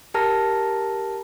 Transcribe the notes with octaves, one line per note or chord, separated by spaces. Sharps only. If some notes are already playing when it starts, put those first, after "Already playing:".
G4 A#4 A5 A#5 F6 A#6